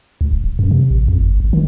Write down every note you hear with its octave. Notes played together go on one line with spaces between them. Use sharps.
C#2
D1
D1
F#2
C3
A1
F2
G1
G#1
D#3